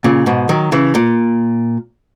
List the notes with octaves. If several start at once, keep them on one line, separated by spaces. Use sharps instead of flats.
A#2 C#3
G#2 B2
D#3 F#3
C#3 E3
A#2